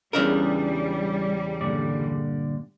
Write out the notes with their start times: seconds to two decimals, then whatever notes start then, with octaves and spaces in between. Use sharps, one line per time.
0.13 E2 C#3 G3 D4 F4 A#4 B4
1.61 G2 A#2 D3 D5